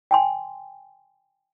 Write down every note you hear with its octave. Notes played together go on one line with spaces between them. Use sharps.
G5 G#5 C6